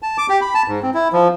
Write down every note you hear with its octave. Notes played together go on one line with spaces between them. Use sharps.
A5
D6
G4
B5
A5
G#2
C4
E4
F3